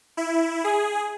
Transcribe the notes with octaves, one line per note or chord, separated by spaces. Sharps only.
E4
G#4